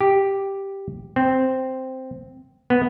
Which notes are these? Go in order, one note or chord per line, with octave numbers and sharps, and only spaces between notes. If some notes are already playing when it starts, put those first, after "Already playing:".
G4
C4
B3